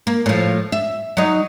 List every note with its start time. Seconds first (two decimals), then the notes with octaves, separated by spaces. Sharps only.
0.07 A#3
0.26 A2 F3
0.72 E5
1.17 F#3 D#4